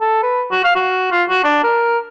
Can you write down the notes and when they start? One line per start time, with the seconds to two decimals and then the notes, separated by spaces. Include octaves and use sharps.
0.01 A4
0.23 B4
0.52 F#4
0.64 F5
0.76 F#4
1.11 F4
1.29 F#4
1.44 D4
1.64 A#4